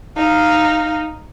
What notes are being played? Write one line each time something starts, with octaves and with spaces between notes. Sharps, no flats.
D#4 F5